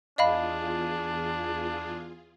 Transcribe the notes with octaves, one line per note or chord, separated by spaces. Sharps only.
E2 D4 F4 G#4 D#5 F5 B5